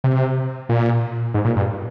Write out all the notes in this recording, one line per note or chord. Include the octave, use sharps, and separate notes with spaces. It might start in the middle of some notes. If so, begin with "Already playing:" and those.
C3
A#2
G#2
A#2
G2